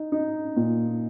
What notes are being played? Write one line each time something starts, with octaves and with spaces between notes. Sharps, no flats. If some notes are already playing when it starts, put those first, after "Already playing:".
Already playing: D#4
D#4
A#2